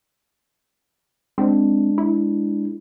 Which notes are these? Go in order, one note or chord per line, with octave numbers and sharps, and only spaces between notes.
G#3 C4 D4
E4